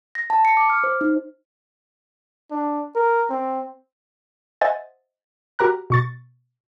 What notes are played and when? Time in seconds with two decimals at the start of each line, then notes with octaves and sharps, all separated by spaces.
0.15 A#6
0.30 A5
0.45 C#7
0.57 D6
0.70 F6
0.84 C5
1.01 D#4
2.51 D4
2.96 A#4
3.30 C4
4.61 C5 D#5 E5 F#5 G#5 A6
5.59 F#4 G4 A#4 A#5 F#6
5.90 B2 C#6 A6